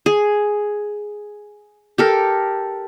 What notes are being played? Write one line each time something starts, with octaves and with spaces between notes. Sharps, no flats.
G#4
G4 A4 A#4